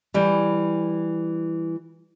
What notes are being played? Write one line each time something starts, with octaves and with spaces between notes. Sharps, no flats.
E3 G3